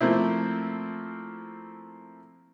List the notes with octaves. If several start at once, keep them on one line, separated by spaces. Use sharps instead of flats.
F3 A3 A#3 C4 E4